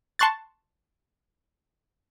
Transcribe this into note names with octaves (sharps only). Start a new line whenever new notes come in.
A5 C6 C#6 F#6 A6